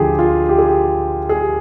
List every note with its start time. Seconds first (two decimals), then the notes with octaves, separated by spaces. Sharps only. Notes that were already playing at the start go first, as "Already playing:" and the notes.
Already playing: D2 D3 F3 G4 G#4
0.19 F4
0.49 G4
0.58 G#4
0.68 G4
1.29 G#4
1.41 G4